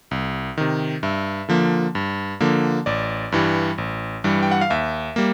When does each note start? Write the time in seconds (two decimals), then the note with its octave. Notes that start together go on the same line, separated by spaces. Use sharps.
0.11 C2
0.57 C3 D#3
1.03 G2 E5
1.49 D3 F3 A#3
1.95 G2
2.40 D3 F3 A#3
2.86 A1 D5
3.32 G2 E3 G3
3.78 A1
4.24 G2 E3 G3
4.43 G5
4.51 F#5
4.61 F5
4.70 D#2 E5
5.16 G3 A#3